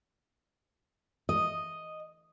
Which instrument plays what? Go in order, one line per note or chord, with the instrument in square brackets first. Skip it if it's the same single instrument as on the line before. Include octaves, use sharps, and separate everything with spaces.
[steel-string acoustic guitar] D#5